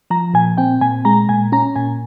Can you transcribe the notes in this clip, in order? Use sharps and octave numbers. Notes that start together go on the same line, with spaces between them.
F3 A#5
A#2 G#5
C4 G5
A#2 G#5
G#3 A#5
A#2 G#5
C#4 A#5
A#2 G#5